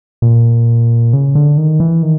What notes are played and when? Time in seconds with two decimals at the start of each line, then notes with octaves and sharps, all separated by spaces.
0.22 A#2
1.13 C#3
1.35 D3
1.57 D#3
1.80 E3
2.03 D#3